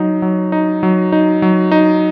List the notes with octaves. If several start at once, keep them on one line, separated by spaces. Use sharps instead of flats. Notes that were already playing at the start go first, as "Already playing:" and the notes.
Already playing: F#3 D#4
F#3
D#4
F#3
D#4
F#3
D#4